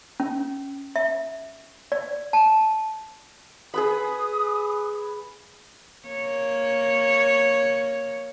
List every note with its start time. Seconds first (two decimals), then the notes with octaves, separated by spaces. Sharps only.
0.20 C#4
0.96 E5
1.92 D5
2.33 A5
3.74 G#4 B4 B5 D#6
6.07 A#3 C#5